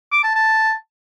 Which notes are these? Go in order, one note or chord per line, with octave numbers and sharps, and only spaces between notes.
D6
A5
A5